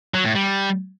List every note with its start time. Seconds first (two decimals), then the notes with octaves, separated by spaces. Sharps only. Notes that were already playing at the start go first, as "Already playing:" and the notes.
0.14 F#3
0.25 A2
0.35 G3